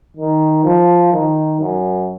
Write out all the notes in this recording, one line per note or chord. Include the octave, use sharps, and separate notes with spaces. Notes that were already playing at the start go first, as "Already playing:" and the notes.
D#3
F3
D#3
F#2